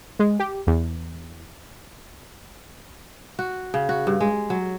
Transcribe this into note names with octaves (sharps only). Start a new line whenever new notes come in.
G#3
G4
E2
F#4
C#3
F#4
G2
G#3
F#3